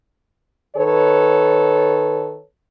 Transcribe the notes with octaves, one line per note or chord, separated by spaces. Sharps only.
D#3 A4 B4 C#5